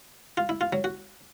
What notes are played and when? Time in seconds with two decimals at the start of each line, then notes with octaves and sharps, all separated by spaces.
0.37 F4
0.49 E4
0.61 F4
0.73 F#3
0.84 F#4